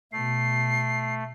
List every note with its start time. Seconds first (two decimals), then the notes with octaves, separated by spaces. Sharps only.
0.13 B2 A3 C7